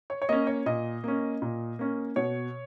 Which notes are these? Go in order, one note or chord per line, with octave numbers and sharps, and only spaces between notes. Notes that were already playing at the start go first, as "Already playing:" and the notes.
C#5
C#5
A#3 C#4 D#5
C#5
A#2 D#5
A#3 C#4
A#2
A#3 C#4
B2 C#5